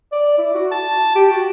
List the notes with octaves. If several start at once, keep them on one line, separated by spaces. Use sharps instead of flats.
D5
E4
F#4
A5
G4
F#4